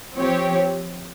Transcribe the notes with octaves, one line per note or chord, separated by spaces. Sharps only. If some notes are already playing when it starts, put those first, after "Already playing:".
F3 C4 G4 C#5